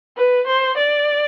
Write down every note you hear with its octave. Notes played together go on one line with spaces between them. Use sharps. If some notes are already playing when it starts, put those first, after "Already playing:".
B4
C5
D5